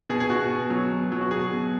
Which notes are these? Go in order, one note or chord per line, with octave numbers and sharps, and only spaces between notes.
B2 G#4
G#4
B2 F#4
B2
F#3
B2
F#3
F#4
B2 G#4
B2